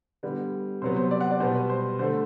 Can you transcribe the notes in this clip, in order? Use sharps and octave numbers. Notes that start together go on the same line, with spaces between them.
D3 G3 B3 B4
C3 F#3 B3 C5
C5
D5
F#5
D5
B2 G3 B3 C5
B4
C5
D3 A3 C5